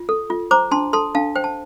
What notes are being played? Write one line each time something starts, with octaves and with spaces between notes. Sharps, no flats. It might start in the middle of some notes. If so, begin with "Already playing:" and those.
Already playing: F4
A4
F4
C5 A#5 D6
D4 A5 C6
A4 A5 C6
D4 F5 A5
C5 G5
A5